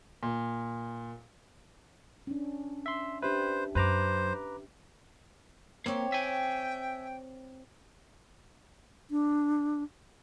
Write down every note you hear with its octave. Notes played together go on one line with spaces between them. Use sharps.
A#2
C#4 D4
E5 C6
D4 G4 B4 C5 E5
F#2 B4 C5 A#5 D6
A#3 C4 G4 C#5
E5 G5 G#5
D4